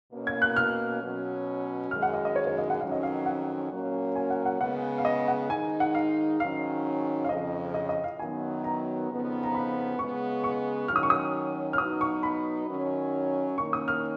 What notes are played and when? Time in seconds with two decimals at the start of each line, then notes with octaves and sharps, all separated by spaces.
0.12 B2 A#3 C#4
0.27 G#6
0.42 F#6
0.56 F6
1.02 B2 F#3 C#4
1.91 F#2 D#3 G#3 F6
2.02 F#5
2.14 D#5
2.25 D#5
2.36 C#5
2.47 C#5
2.58 D#5
2.70 F#5
2.81 F2 D#3 F#3 C#4 F5
2.92 D#5
3.03 F5
3.26 F#5
3.71 A#2 F#3 A#3 C#4
4.16 G#5
4.30 F#5
4.46 F#5
4.61 C#3 G#3 B3 F#5
4.98 F5
5.05 D#5
5.28 F#5
5.50 G#2 D#3 G#3 D#4 G#5
5.80 F#5
5.95 F5
6.40 G#2 D#3 F#3 C#4 F5
7.24 F5
7.29 F2 C#3 F3 D#5
7.74 D#5
7.89 D#5
8.04 F5
8.19 F#2 D#3 F#3 B3 G#5
8.64 A#5
9.09 F2 C#3 F3 B3 D#4
9.44 A#5
9.54 B5
9.98 C#3 G#3 B3 C#6
10.44 C#6
10.88 D#3 F#3 C#4 F6
10.96 D#6
11.03 C#6
11.10 D#6
11.73 F6
11.78 B2 F#3 B3 D#4 D#6
12.01 C#6
12.23 B5
12.68 F#2 D#3 F#3 C#4
13.58 D#3 A#3 C#4 C#6
13.73 D#6
13.88 F6